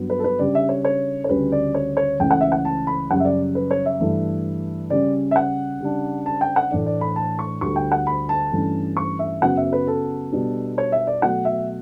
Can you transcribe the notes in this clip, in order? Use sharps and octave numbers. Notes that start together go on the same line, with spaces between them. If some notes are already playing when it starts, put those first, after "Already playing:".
Already playing: G2 F#3 B3
B4
A4
B4
C#3 G3 D4 D5
E5
C#5
C#5
C#5
D2 C#3 G3 C#4 B4
D5
C#5
C#5
C#2 C#3 E3 A3 G5
F#5
E5
F#5
A5
B5
F#2 C#3 G3 C#4 F#5
E5
D5
B4
C#5
E5
G2 E3 A3
C#3 G3 C#4 D5
E5
F#5
C#3 G3 D4
A5
G5
F#5
A2 E3 A3 D4 D5
D5
B5
A5
C#6
D2 D3 G3 C#6
G5
F#5
B5
A5
G2 E3 A3 C#4
C#6
E5
F#2 C#3 F#3 B3 F#5
E5
B4
A4
B2 G3 B3 D4
C#5
E5
D5
B2 F#3 A3 F#5
E5